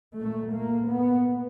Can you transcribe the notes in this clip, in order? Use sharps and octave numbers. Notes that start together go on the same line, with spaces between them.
A#2 A3
A#3
B3